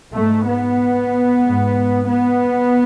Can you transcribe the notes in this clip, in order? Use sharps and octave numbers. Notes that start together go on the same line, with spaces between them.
G#2 A3
B3
G#2
B3